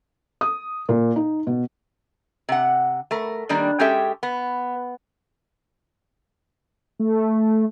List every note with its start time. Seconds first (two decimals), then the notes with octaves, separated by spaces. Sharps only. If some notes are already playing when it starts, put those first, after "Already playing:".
0.41 D#6
0.89 A#2
1.16 D#4
1.47 B2
2.49 C3 F#5
3.11 A3 A#4
3.49 D#3 G3 A#3 D4
3.79 G#3 C#4 G4 A4 E5 G5
4.23 B3
6.99 A3